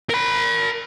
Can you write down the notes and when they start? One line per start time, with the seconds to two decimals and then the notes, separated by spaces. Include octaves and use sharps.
0.10 A#4 B5